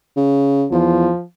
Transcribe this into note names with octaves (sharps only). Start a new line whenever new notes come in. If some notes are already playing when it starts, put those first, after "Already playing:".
C#3
E2 F3